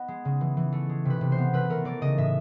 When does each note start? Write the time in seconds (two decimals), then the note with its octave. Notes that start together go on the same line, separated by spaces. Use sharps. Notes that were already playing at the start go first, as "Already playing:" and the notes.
Already playing: B3 D#5
0.08 G#3
0.25 C#3
0.41 E3
0.57 E3
0.72 A3
0.89 G#3
1.05 C3 B4
1.21 C3
1.32 C5
1.38 B3
1.53 A3 B4
1.70 A3 A#4
1.85 E3 D5
2.01 C#3 D#5
2.18 A2 E5